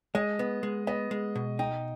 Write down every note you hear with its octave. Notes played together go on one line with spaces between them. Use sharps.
G#3 D#5
B3
G#3
B3 D#5
G#3
B2
D#4 G5